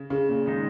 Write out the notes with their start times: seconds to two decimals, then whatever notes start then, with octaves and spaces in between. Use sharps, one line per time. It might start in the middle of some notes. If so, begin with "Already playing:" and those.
Already playing: C#3
0.10 C#3
0.29 A#2
0.47 D#3 G#3 D#4